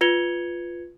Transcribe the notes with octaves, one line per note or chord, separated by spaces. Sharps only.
F4 B4 G#6 C#7 F7 G7